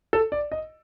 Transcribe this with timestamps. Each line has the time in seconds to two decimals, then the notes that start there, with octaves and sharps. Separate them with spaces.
0.13 A4
0.32 D5
0.52 D#5